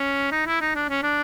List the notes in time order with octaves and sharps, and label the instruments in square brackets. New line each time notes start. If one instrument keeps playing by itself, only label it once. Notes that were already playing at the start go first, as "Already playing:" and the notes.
Already playing: [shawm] C#4
D#4
E4
D#4
D4
C#4
D4